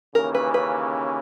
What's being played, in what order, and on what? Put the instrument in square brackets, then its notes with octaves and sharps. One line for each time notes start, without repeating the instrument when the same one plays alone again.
[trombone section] D#2 C#3 E3 A#3 C#4 [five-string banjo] A#4
[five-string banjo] B4
B4